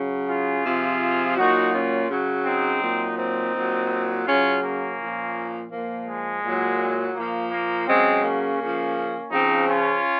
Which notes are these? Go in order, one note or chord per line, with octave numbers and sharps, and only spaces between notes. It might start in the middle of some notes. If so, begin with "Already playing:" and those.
Already playing: C#3 F#3
F4 G#4
C3 F3
A#2 F#3 D#4 F#4
C#4 F4
C#3 F#3
C4 D#4
A#2 F#3
C4 D#4
A#2 F#3
C#3 F#3 C#4 F4
A#3 C#4
A#2 F3
A#2 F3 A#3
G#3
A#2 F#3
A#2 F3 A#3
A#3
C#3 F#3 G#3 C4
A#3 C#4
C#3 F3
C#3 F3 C4 D#4
C#4 F4